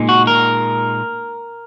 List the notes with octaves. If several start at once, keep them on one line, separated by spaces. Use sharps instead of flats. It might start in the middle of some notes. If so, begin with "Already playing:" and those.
Already playing: A#2 G#3 D#4
F#4
A#4